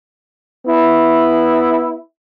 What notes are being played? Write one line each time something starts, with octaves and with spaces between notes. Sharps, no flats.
B3 E4